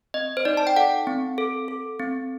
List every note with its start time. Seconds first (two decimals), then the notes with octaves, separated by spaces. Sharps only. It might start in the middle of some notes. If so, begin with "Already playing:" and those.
0.14 C4 D#5
0.37 C5
0.45 D#4 D5
0.57 A5
0.67 G5
0.76 A4 F#5
1.07 C4
1.38 A4
1.68 A4
1.99 C4